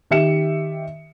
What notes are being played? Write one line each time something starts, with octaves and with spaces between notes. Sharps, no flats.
D#3 G4 E5 C#7 E7